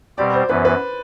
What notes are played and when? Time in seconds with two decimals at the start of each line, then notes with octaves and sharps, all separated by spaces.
0.18 B2 G3 C4 G4 D5
0.34 C5
0.50 F#2 E3 B3 B4
0.65 B4